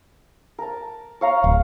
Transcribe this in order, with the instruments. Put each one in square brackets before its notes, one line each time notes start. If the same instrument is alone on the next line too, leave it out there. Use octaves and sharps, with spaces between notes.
[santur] A#4 A5
C#5 F5 A#5
[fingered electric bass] D1